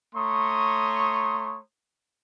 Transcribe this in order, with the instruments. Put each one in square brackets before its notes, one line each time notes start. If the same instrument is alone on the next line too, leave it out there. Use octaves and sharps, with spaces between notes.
[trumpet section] A3 C#5 A#5 C6 C#6 D#6